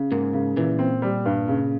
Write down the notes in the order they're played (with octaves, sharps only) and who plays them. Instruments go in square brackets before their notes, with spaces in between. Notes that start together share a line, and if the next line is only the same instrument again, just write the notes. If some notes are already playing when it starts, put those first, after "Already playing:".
Already playing: [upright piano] C#3
[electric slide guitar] G#2 [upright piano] A#3
[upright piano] C#3
[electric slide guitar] A#2 [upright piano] E3
[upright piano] C4
G3
G2
C#3